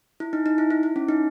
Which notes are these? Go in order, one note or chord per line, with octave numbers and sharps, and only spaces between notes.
E4
D#4
D#4
E4
E4
E4
C#4
D#4